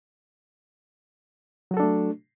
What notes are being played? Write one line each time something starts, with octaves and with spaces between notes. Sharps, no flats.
F#3 A3 D4 F#4 A4